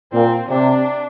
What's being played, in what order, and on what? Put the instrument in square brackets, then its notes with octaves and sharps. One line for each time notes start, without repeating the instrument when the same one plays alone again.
[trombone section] A#2 [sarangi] C4
[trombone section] C3 [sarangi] D4